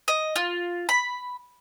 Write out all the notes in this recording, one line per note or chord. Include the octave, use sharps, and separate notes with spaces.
D#5
F4
B5